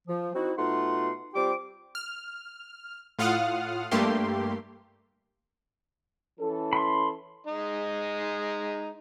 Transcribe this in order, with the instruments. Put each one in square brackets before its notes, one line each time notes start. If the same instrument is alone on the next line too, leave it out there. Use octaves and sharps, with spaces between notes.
[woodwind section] F3
C4 D#4 E4 F#4
B2 A3 D#4 F4 F#5 C6
G3 C4 F4 G4 G5 D6
[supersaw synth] F6
A2 F4 F5 F#5 D#6 F6
G2 A3 A#3 G4 C6
[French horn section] E3 C#4 A4
[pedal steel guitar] B5 C6
[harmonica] G#3 D#4 D#5